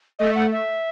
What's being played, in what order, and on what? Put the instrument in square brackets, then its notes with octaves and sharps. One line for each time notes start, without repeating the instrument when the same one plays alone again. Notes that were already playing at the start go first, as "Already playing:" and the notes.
[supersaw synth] A3 [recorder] D#5
[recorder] F#5
E5